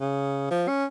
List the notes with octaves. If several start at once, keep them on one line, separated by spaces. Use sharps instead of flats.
C#3
F3
C#4